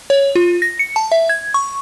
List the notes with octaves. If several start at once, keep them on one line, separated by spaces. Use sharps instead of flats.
C#5
F4
A#6
C#7
A5
E5
G#6
C#6